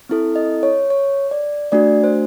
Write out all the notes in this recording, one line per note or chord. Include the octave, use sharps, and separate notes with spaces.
C4 E4 A4
D#5
C#5
C#5
D5
A3 D4 F#4 D5
C5